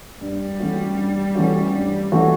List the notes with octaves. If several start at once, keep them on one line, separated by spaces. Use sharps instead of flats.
G2 G3
E3 A3 C#4 F#4
G2
E3 A3 C#4 F#4
G2
E3 A3 C#4 F#4